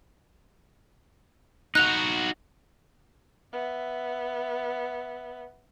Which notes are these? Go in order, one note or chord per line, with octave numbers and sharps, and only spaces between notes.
D#4 F#4 F#6 F7
B3 E5